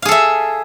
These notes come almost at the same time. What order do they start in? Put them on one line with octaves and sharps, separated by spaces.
F5 G#4 A4 E5